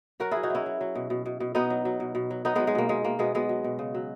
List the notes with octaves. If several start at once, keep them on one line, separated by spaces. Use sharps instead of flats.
F#3 F#4 A#4
F#3 E4 G#4
D#4 F#4
F#3 C#4 E4
F#3
F#3
B2
B2
B2
B2
B2 B3 D#4
F#3
F#3
B2
B2
F#3
F#3 B3 D#4
F#3 G#3 B3
G#3
B2 A#3
B2 G#3
B2 A#3
B2 G#3 B3
F#3 G#3 B3
F#3
B2
C#3
F#3